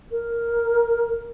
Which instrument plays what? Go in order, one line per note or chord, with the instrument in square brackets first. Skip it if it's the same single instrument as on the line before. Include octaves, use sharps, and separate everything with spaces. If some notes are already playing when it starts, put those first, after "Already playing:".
[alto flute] A#4